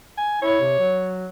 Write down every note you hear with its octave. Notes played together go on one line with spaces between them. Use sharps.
G#5
E4 C#5
C3
F#3